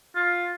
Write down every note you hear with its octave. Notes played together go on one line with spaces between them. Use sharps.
F4